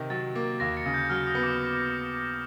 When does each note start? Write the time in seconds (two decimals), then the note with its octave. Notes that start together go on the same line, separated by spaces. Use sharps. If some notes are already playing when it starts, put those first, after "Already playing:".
Already playing: C3 D#3
0.10 F#3 A6
0.35 A#3
0.60 D#2 A#6
0.77 C#7
0.86 C#3
0.94 G6
1.10 F#3 F6
1.27 D#6
1.35 B3
1.43 D6